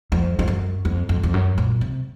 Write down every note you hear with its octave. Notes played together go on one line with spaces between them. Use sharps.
F2
F2
F#2
F2
F2
F2
F#2
A#2
C3